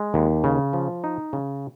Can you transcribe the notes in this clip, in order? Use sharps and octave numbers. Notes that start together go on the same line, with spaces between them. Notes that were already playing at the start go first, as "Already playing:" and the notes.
Already playing: G#3
D#2
C#3
F3
D#4
C#3